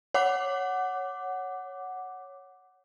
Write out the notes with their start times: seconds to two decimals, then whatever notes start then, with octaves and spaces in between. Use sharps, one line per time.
0.14 C#5 F#5 D6